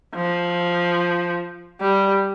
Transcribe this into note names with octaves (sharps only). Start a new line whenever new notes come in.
F3
G3